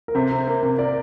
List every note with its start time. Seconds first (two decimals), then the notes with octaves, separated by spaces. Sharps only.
0.08 A#4
0.15 C3 A4 C5
0.31 C3
0.47 A#3
0.62 C3
0.78 A#4 D5